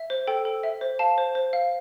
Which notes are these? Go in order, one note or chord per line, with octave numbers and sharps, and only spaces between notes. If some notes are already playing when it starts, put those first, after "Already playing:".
Already playing: E5
C5
A4 G5
A4
E5
C5
F5 A5
C5
C5
F5